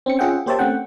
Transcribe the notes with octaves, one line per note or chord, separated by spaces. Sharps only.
C4 C#4 C#7
C#4 F4 G#4 E5 F#5 G5
A#3 G4 C5 C#5 E5 A5
A3 C4 C#4 F#5 G5